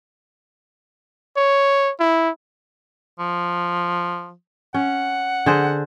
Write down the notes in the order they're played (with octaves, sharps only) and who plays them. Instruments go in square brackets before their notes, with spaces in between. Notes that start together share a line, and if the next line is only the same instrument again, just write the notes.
[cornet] C#5
E4
[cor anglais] F3
[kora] C#4 [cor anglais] F#5
[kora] D3 G#4 C5